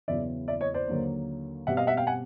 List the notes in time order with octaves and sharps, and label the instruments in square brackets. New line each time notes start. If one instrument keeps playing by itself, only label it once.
[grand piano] E2 C#3 F#3 B3 E4 D5 E5
D5 E5
C#5 D#5
C5 D5
D#2 D3 F#3 A#3
B2 G3 C4 E5 F#5
D#5 F5
E5 F#5
F5 G5
F#5 G#5